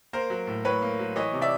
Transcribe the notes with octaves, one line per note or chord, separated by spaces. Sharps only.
A#3 A#4 C5
F#3
A2
A2 B4 C#5
A#3
F#3
E3 C#5 D#5
C3
D5 E5